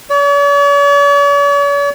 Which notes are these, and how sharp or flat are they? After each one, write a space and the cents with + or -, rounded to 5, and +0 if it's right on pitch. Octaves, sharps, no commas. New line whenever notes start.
C#5 +45